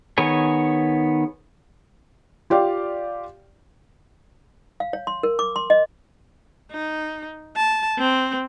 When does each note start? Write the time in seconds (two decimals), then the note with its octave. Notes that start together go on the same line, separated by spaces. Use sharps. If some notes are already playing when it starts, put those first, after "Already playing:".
0.18 D#3 B3 G#4 C#5 G#5
2.50 F4 G4 D5 F5
4.80 F5
4.93 C#5
5.07 C6
5.23 A#4
5.39 D6
5.56 C6
5.70 D#5
6.71 D#4
7.56 A5
7.99 C4